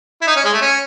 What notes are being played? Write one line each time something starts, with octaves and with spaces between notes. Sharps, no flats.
E4
D#4
C#4
G#3
A3
C#4